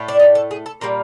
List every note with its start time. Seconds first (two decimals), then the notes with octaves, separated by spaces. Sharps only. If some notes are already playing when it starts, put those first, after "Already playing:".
Already playing: A2 A3
0.08 D4
0.19 D#4
0.35 A4
0.51 G#4
0.66 A4
0.81 A#2 G3 A#3 A#4